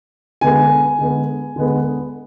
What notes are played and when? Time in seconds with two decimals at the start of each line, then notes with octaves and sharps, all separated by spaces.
0.41 D3 G#3 B3 G#5
0.98 D3 G#3 B3
1.56 D3 G#3 B3